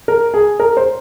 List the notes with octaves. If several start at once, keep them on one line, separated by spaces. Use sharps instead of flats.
A#4
G#4
A#4
C5